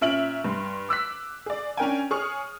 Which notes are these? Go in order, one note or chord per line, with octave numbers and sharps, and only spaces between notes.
A#2 C#4 E5 F6 D7 F#7
G2 C6
D6 E6 F#6 B6
G#4 D5
C#4 D4 A#4 G5 G#5
G#4 C#5 C#6 D#6 F6